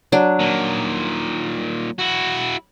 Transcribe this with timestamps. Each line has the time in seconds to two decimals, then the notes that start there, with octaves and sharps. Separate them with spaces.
0.12 F#3 D4
0.40 A#2 D#3
1.99 E4 F#4